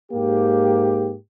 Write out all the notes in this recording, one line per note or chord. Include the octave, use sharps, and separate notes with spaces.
G#2 A#3 G4